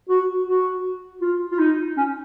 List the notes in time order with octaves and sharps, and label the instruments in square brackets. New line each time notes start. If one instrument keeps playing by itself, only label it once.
[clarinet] F#4
F#4
F4
F4
D#4
C#4